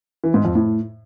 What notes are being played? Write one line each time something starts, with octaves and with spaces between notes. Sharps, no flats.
E3
G#2
F2
A2